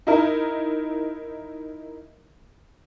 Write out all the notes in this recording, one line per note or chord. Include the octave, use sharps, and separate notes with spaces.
D#4 E4 A#4